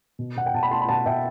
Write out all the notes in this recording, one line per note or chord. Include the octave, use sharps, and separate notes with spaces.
B2
B2 F#5
G5
B2 A5
B5
A3 A5 C6
B5
B2 F#5 A5
B2 E5 G5